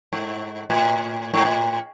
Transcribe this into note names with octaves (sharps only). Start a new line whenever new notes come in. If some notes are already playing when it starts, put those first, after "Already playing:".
G#2
A2
G#2
A2